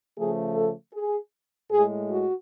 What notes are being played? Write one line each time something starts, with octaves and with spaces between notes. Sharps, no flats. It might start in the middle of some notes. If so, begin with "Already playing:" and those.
C#3 F3 A3 G#4
A4
G#4
A2 G#3 G#4
F#4